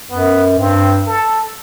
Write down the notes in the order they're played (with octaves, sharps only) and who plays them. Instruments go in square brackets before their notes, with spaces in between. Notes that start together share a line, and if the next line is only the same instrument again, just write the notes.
[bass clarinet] F#2 [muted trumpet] B3
[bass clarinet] G2 [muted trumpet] C4
[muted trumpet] A4